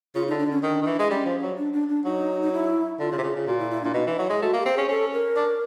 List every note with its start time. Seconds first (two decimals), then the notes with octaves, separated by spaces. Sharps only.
0.15 C#3 F4
0.28 D3 D#4
0.39 D4
0.46 D3 C#4
0.63 D#3 D4
0.82 D#3
0.86 E3
0.99 G#3
1.10 G3 C#4
1.25 F3
1.42 F#3
1.58 D4
1.73 D4
1.89 D4
2.05 F#3 D#4
2.42 D#4
2.53 E4
2.99 D3 F4
3.12 C#3
3.18 C3
3.23 C#3
3.36 C#3
3.47 A#2 F#4
3.59 E4
3.71 E4
3.82 A#2 D4
3.94 B2 D#4
4.07 E3
4.11 E4
4.18 F#3
4.30 G#3
4.42 A3 F#4
4.53 A#3
4.58 G4
4.66 C4
4.74 C#4 G#4
4.89 C#4 A4
5.13 A#4
5.36 D4